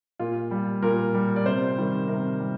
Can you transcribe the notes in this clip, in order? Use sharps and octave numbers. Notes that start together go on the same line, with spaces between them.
A#2 F4
G3
A#2 A#4
G3
D5
C3 C5
D#3 G3
C3 A#4
G3